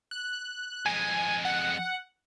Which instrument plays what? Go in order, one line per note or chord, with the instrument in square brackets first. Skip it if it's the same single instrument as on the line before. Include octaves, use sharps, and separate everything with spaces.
[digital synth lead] F#6
[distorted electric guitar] F2 G#3 [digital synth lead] G#5
[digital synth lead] F#5